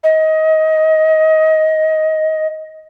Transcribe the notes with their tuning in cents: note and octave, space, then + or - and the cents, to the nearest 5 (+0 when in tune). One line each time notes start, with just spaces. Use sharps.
D#5 +20